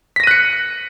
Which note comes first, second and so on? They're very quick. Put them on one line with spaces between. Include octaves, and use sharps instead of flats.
B6 A#6 D#7 F#6 C#7